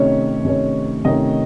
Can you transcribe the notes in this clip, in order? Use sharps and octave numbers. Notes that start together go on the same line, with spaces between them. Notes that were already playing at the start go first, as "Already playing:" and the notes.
Already playing: C3 D#3 A3 C#4 C#5
C3 D#3 A3 C#4
C3 D#3 A3 C#4 D#5